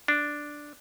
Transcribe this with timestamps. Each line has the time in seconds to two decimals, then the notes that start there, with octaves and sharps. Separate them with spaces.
0.08 D4